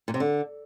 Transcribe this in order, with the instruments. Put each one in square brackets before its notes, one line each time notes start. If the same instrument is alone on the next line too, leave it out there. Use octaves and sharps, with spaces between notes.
[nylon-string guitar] A#2
C3
D3